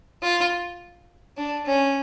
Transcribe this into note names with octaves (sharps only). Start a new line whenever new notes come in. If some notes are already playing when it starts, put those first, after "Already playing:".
F4
D4
C#4